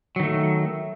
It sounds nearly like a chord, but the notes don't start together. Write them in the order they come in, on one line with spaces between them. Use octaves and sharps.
F#3 D#3 A3